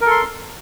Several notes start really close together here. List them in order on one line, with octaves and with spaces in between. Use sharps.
A#4 A4 C6